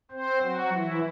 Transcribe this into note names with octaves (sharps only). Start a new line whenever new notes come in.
C4 C5
F#3 F#4
E3 E4